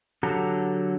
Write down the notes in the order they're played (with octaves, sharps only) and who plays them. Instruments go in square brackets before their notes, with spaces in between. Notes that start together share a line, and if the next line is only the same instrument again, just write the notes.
[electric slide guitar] D3 F#3 G4 A4 F#5 A#5